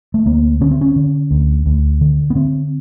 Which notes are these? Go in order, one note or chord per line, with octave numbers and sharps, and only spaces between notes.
A3
D2 A#3
D3 C#4
C4
C#4
D3
D2
D2
D3
B3
D3 C4